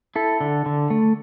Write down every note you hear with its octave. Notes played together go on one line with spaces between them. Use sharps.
E4 A4
D3
D3
A3